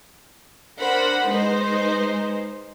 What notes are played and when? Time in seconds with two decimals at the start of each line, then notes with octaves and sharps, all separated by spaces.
0.79 D4 A#4 C5 F#5 B5
1.28 G#3 D#4 B4 C5